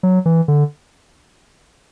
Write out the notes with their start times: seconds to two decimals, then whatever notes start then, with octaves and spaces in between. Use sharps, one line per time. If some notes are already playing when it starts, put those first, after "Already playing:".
0.03 F#3
0.26 E3
0.48 D3